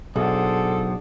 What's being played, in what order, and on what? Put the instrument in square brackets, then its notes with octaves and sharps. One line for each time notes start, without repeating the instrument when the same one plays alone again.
[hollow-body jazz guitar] B1 [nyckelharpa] D4 G#4 [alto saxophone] A4 [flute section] C5 F#5 D#6